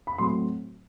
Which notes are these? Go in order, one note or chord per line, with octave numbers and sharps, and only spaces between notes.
B5
A2 F#3 C4 C6